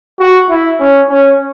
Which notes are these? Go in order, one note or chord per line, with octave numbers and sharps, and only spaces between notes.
F#4
E4
C#4
C#4